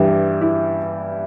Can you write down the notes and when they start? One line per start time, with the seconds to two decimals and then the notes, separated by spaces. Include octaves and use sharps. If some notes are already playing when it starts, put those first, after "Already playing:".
Already playing: G2 E3 G3
0.41 E4